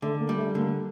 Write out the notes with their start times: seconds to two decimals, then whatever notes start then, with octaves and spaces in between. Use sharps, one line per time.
0.02 D3 A3
0.20 A#3
0.29 G3
0.38 A3
0.55 D3 A#3